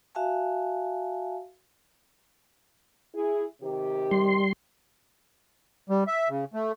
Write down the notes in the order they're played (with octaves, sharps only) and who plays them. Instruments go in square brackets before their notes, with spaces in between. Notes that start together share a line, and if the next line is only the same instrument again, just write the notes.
[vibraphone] F#4 E5 F5 G#5 A5
[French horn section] E4 G#4
C3 D#3 G4
[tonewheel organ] G3 C6
[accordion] G3
E5
C#3
A3